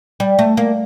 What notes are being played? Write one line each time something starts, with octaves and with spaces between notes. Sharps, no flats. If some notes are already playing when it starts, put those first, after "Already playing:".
G3
A3
A#3